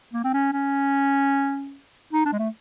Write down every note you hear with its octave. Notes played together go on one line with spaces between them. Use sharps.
A#3
C4
C#4
C#4
D#4
D4
G#3
A3